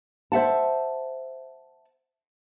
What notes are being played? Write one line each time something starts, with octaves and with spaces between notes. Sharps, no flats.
C5 E5 F#5 A5